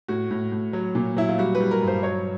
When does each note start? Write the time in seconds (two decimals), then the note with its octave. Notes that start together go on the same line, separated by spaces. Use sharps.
0.08 A2 F#4
0.31 A2
0.52 A2
0.73 F#3
0.95 A#2
1.17 F#3 E4
1.29 F4
1.38 G3 F#4
1.55 B4
1.61 G3
1.71 A#4
1.82 G2
1.87 C5
2.03 F#3 C#5